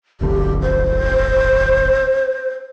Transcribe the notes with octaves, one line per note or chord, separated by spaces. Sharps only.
D1 G1 D3 G4
C5